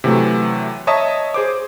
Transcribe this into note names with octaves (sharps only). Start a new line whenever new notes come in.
C3 E3 F#3 A3
C#5 D#5 E5 A5 A#5 D#6
G#4 C5 D6